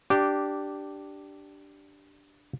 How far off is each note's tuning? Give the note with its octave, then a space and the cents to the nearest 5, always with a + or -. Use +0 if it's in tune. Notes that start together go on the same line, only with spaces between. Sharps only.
D4 +0 G4 -10